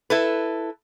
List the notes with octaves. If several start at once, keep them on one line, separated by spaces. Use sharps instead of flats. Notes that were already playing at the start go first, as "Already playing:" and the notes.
E4 A4 B4